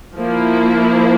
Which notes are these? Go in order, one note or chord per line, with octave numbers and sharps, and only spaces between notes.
F3 A#3 E4